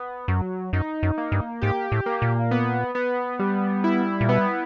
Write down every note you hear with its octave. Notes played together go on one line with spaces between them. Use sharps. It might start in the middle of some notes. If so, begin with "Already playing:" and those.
Already playing: B3
F#2 F#3
F#2 D#4
F#2
A#3
G2
G#2 G4
A2
A#3
A#2
B3
B3
G3
E4
A#2
B2 B3